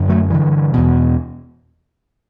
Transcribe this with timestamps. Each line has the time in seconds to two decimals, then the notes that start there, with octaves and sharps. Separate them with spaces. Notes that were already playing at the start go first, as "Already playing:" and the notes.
Already playing: F#2 D3
0.09 F#3 A3
0.30 G2 D3 E3
0.73 E2 B2